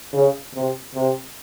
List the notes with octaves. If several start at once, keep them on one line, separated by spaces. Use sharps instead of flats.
C#3
C3
C3